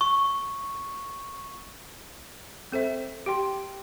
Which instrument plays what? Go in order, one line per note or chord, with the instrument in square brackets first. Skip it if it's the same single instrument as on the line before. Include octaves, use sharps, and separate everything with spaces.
[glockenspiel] C#6
[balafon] C4 A4 C5 E5
G4 G5 C6